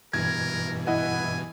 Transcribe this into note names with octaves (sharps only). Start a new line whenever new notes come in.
G2 B2 E3 A#4 G#6
E4 D#5 F#5 G#5